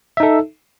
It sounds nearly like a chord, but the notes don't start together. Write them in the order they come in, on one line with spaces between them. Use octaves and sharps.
E5 D#4 A4